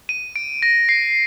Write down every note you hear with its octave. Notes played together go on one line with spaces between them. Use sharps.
D#7
D7
A#6
C7